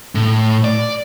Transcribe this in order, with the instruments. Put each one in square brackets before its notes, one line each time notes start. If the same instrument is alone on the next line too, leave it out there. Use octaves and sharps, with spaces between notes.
[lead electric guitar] A2
D5